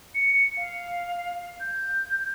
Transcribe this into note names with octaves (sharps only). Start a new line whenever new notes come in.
C#7
F5
G6